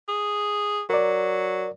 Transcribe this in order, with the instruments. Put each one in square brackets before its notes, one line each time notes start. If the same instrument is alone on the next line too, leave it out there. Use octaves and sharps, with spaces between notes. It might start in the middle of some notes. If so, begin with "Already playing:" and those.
[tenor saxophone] G#4
[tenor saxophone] F#3 [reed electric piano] A#4 D5